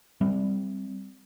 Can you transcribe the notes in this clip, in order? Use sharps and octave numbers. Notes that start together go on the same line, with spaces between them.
G3 C4